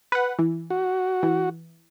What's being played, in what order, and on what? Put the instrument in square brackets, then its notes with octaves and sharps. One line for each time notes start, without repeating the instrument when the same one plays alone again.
[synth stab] B4 F#5
E3
[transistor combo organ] F#4
[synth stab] E3